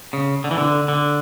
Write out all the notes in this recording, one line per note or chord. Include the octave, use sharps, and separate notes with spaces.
C#3
D3
E3
D3
D3